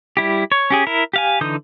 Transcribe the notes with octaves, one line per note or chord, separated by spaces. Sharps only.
G3 E4 G4
C#5
C#4 G4 G#4
E4 A#4
G4 F5 G#5
D3 E3 D#4 D#6 G6